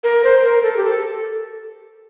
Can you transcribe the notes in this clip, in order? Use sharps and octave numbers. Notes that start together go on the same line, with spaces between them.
A#4
C5
A#4
A4
G4
A4